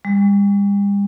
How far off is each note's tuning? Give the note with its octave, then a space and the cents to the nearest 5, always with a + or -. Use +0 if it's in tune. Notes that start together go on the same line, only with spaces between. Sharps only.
G3 +40